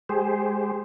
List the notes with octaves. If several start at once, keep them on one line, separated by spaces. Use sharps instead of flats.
G#3 G4 G#4 C5